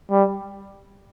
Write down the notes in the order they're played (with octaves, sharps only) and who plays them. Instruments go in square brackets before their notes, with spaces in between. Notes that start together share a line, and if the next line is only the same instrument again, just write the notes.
[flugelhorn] G3